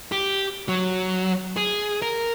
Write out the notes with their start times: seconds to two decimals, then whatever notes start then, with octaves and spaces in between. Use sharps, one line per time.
0.12 G4
0.68 F#3
1.57 G#4
2.02 A#4